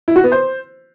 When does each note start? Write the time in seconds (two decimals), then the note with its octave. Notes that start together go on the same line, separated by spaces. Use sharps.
0.08 E4
0.16 F#4
0.24 B3
0.32 C5